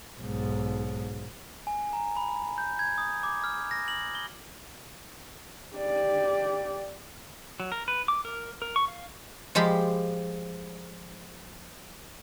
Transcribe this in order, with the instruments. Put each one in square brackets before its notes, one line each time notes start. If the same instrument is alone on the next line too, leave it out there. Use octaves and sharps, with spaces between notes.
[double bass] B1 G#2
[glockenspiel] G#5
A#5
B5
G6
G#6
D#6
D6
F6
A#6
F#7
G7
[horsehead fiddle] G4 D5
[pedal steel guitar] F#3
A#4
B4
D6
A#4
A#4
C#6
F5
[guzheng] F3 G#3 G4 B5